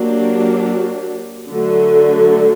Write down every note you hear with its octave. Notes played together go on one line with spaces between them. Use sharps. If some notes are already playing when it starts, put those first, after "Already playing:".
Already playing: F#3 A#3 D4 G4
D3 F#3 A3